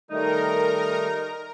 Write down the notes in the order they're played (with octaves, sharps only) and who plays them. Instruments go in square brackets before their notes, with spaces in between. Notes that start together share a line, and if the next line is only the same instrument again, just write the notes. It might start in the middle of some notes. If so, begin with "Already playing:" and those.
[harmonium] D#3 G3 A3 [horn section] D#4 [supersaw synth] A#4 A#5